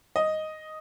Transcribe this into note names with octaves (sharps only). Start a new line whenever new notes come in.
D#5